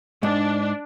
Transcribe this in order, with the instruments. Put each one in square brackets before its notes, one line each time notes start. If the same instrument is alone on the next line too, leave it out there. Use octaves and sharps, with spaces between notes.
[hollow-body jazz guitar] G#2 [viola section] D4